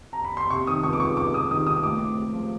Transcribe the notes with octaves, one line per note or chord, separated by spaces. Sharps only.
A#5
B5
C6
C3 C#6
D#3 D#6
C#2 C#6
D6
C#2 C#6
C#2 D6
C#2 D#6
D#3 D#6
C#2 D#6
A2 D6
C4
G#3
F3